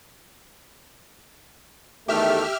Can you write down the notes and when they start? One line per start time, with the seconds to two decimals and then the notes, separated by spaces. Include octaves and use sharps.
2.08 E2 D#3 A3 G4 E5 F6